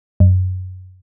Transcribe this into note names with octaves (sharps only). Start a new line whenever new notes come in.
F#2